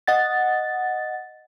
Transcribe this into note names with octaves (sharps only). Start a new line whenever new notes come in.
D#5 F#5 A6